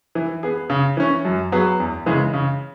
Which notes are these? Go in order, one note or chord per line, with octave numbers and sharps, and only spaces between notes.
E3
B3 G#4
C#3
E3 C#4
F#2
F#3 B3 G#4
E2
C#3 E3 G#3
C#3